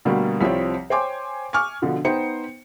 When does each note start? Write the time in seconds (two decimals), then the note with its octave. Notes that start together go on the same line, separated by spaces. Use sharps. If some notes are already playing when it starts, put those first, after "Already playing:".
0.05 B2 D3 G3 A3 A#3
0.41 C2 F3 G3 C4 C#5 G5
0.90 C5 C#5 G5 G#5 C6 D6
1.53 G#5 C#6 D6 F6
1.82 B2 D3 F3
2.05 B3 D#4 C5 G5 C#7